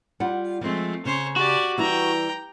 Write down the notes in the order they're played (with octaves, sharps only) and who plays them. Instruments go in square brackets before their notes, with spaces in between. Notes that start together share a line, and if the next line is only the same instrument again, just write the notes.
[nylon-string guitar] G3 F4 F#5
[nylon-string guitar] F3 G#3 [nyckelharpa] A3 C4
[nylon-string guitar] C#3 [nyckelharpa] C5 C#5
[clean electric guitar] F#4 [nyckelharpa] G4 D5
[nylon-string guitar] E3 G3 E4 [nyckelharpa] G5 A#5